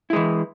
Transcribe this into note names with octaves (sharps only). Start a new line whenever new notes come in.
E3 G#3 E4